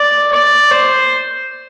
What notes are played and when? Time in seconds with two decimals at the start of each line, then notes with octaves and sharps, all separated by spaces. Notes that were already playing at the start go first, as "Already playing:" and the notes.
Already playing: D5
0.32 D5
0.72 C5